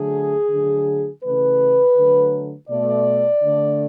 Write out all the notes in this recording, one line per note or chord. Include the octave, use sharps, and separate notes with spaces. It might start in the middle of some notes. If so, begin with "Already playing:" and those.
Already playing: D3 F#3 A3 G#4
D3 F#3 A3
C#3 E3 A3 B4
D3 F#3 A3
B2 A3 D5
D3 A3